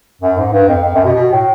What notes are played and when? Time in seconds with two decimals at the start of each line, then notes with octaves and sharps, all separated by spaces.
0.22 F#2
0.37 G#2
0.53 G2
0.68 F2
0.84 F2
0.95 F#2
1.05 B2
1.15 B2
1.32 A2